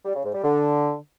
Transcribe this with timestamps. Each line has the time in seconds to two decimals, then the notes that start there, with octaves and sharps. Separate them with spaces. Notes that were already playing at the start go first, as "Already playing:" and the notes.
0.05 G3
0.15 C#3
0.24 G#2
0.34 G3
0.44 D3